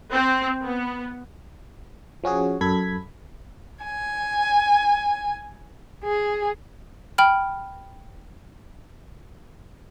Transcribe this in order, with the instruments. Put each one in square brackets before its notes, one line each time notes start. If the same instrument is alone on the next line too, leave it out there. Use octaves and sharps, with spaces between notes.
[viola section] C4
B3
[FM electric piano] F3 C#4 F#4 G#4
F#2 A4 B5 G#6 B6
[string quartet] G#5
G#4
[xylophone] G5 B5 F6